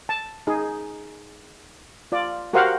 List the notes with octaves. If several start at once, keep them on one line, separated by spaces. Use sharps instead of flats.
A5
D#4 G#4
F4 D5
F#4 G4 A#4 C5 F5 F#5